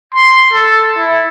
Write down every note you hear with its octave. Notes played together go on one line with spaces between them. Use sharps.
C6
A4
E4